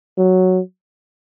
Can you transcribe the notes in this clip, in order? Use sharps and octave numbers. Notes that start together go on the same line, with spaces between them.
F#3